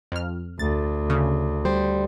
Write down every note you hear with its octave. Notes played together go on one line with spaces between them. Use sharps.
F2 F6
D2 A6
C#3
G3 C5